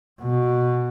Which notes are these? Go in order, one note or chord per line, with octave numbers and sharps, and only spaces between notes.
B2